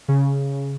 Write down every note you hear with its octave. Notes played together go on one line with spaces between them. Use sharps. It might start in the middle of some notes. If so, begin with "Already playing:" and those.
C#3